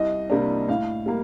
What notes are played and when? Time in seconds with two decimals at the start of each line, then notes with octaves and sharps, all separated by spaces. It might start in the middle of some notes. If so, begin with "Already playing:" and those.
Already playing: C2 D#5
0.30 C3 G3 A#3 D4
0.68 A2 F5
1.06 G3 A#3